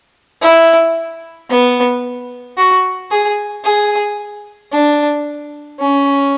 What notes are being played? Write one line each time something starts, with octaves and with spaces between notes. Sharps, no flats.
E4
B3
F#4
G#4
G#4
D4
C#4